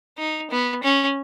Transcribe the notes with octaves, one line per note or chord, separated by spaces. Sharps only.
D#4
B3
C#4